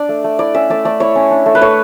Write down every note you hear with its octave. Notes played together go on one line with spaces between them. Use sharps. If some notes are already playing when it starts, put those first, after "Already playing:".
Already playing: D4 D5
A3
A3
E4 D5
C#4 E5
A3 D5
A3 D5
E4 C#5
C#4
D4
A3
B4
A3 C#5